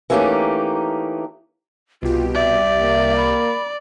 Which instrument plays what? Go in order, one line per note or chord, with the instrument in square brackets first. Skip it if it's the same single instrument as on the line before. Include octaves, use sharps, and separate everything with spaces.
[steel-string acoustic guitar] E3 A3 A#3 C#4 D#4 G4
[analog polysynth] C2 G4 [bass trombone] B2 [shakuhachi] F4
[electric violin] D5 [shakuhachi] E5
[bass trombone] A#3
[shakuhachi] B5